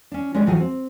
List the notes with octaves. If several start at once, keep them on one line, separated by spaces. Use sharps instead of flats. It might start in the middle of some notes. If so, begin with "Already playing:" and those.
C#4 D4
G#3 C#4 G4 G#4 D5
A2 E3 F#3 F4 G#4
C4